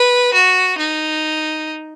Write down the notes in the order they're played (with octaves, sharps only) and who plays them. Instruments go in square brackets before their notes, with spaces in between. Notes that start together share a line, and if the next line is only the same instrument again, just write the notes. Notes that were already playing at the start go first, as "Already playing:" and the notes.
Already playing: [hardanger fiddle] B4
F#4
D#4